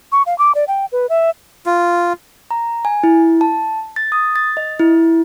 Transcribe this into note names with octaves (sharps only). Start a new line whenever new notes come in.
C#6
F5
D6
D5
G5
B4
E5
F4
A#5
G#5
E4
A5
A6
D#6
A6
D#5
E4